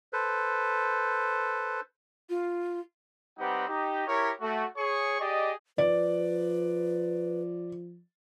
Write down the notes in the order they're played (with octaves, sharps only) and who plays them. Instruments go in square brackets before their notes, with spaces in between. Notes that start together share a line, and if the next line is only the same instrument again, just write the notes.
[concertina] A4 B4 C5
[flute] F4
[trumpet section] G3 C4 D#4 G4 B4 F#5
D#4 G4
E4 G4 A#4 C#5
A3 F#4
G#4 C#5 C#6
G4 G#4 D5 D#5
[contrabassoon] F3 [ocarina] B4 [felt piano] D5